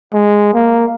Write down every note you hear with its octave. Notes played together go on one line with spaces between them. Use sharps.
G#3
A#3